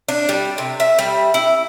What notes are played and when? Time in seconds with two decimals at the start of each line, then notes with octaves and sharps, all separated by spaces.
0.09 D4
0.29 G3
0.58 C3
0.80 E5
0.99 G3
1.34 E4